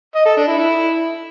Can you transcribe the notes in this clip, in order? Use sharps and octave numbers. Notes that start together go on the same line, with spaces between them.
D#5
A4
D4
E4
E4